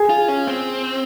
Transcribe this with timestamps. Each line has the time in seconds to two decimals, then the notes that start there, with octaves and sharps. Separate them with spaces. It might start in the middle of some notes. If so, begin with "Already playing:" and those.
Already playing: G#4
0.10 F4
0.28 C#4
0.47 C4